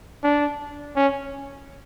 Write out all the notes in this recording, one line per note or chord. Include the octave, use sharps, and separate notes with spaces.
D4
C#4